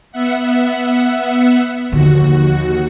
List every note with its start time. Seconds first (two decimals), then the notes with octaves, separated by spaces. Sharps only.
0.12 B3 E5 F#5
1.92 D#2 D3 F3 F#4